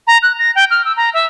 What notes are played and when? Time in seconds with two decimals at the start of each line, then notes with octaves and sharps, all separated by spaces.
0.07 A#5
0.22 F#6
0.39 A#6
0.55 G5
0.71 F6
0.85 E6
0.97 A#5
1.14 E5